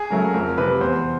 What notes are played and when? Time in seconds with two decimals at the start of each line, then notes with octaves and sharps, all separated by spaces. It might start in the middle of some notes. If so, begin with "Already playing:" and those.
Already playing: G#4
0.10 C#3 F#3 A3 A#4
0.34 F2 A#4
0.58 C3 F3 B4
0.81 E2 C5